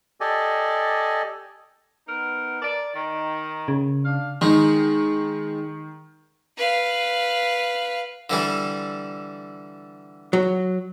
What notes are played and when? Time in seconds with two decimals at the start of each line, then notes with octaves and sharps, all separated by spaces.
0.20 G4 A4 D5 D#5 G#5
2.07 B3 D#4 A#4
2.61 A#4 D5
2.94 D#3
3.68 C#3
4.03 D4 F5
4.41 D#3 G#3 D#4
6.57 B4 F5
8.30 D3 E3 G3
10.33 F#3